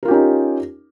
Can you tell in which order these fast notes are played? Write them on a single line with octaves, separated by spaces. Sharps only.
A#4 F4 G4 C#4 D#4